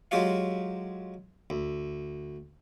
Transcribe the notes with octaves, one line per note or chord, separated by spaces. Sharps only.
F#3 G#3 F4 G4 C#5 F5
D2